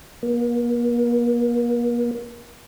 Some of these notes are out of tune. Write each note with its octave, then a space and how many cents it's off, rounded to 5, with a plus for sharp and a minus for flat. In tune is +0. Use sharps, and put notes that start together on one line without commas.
A#3 +40